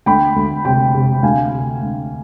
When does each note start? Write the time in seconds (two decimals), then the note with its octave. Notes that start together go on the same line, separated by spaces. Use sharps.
0.06 D2 G5 B5
0.36 D2
0.65 C3 G5 B5
0.95 C3
1.23 D2 F5 G#5
1.52 C3
1.81 D2